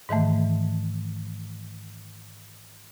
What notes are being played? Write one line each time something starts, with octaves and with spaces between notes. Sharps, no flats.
G#2 D#3 E3 A3